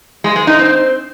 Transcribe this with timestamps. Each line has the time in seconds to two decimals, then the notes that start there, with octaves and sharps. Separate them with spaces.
0.24 G#3
0.36 G#3
0.47 D#4
0.59 C4